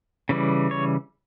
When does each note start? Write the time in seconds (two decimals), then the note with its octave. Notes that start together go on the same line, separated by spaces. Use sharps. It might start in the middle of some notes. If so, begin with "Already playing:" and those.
0.29 C#3 E3 G3
0.71 C#5